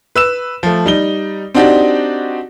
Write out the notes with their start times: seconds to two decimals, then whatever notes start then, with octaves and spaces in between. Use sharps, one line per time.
0.16 B4 E6 E7
0.63 F3 A3
0.86 G3 D#4 G7
1.55 C4 D4 D#4 F#4 G4 D5